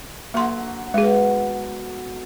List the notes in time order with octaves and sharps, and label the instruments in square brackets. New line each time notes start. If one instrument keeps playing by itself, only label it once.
[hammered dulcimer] D3 F#3 [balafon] A#3 C6
[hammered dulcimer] B2 [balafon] G#3 G#4